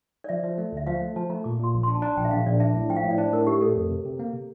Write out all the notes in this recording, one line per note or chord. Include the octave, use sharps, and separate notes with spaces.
D5
F3 E5
F3
A3
D2 E5
F3 F5
A3
F3 A5
A3 A#5
A#2 D6
A#2 C6
A#1
C6
D4
A5
D4 A#5
A#1 G5
E5
A#1 F5
A#1 D5
D4 E5
A2
F3 G5
F5
A2 E5
D5
D4 C5
A2 A#4
A3 G4
A3 A4
F2
C3
C3
A#3
C3